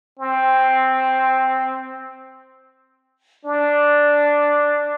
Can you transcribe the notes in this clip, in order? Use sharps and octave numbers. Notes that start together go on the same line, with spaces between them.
C4
D4